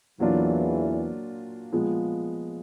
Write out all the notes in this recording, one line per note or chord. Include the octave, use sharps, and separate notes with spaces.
E2 A#2 E3 F#3 A#3 D4 F4
A#2 F3 G#3 B3